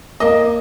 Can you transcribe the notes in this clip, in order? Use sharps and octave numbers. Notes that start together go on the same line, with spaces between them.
A#3 D#5